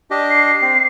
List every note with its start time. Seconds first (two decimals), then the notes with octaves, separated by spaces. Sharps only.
0.11 D4 G4 D#5
0.31 C7
0.62 C4